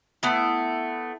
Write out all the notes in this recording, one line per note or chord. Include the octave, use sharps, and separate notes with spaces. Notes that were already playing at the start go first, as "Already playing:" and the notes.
A3 B3 E4